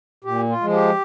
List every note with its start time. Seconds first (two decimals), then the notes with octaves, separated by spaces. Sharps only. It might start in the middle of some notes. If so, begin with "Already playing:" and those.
0.24 A#2 G4
0.49 F4
0.61 F3 G#3
0.73 G4